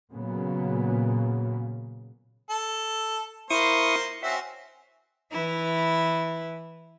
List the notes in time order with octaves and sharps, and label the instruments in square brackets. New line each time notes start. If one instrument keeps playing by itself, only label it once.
[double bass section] A#2 C#3 F#3 A#3 B3
[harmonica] A4
[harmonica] A#3 C5 [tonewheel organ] E4 C#6 D#6
[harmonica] C4 C#4 F#4 [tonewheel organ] E5
[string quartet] E3 E4 B4